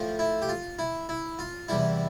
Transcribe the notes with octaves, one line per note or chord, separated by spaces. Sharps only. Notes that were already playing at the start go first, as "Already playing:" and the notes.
Already playing: A2 F3
E4
G4
F4
E4
E4
F4
E2 C3 E3 G3 E4